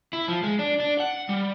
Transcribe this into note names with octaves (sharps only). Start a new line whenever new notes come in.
E4
F3
G#3
D4
D4
F#5
G3